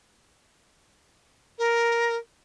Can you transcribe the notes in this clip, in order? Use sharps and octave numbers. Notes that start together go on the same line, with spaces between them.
A#4